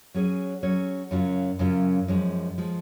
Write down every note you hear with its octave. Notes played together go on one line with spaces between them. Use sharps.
F#3 C#4 G#4 C#5
F#3 C#4 G#4 C#5
F#2 C#3 F#3 C#4 F4
F#2 C#3 F#3 C#4 F4
F#2 F3 G#3
F3 G#3